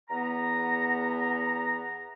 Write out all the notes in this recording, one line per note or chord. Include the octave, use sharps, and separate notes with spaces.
E2 B3 A#5